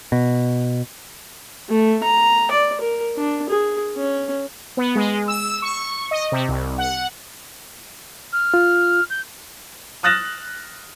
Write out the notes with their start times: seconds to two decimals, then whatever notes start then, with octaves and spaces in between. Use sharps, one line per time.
0.12 B2
1.69 A3
2.03 A#5
2.51 D5
2.80 A#4
3.17 D4
3.49 G#4
3.96 C#4
4.77 B3
4.95 G#3
5.28 E6
5.62 C#6
6.11 D#5
6.32 C3
6.48 C2
6.78 F#5
8.32 F6
8.54 F4
9.10 G6
10.03 D#6 F6 F#6 A6 A#6 E7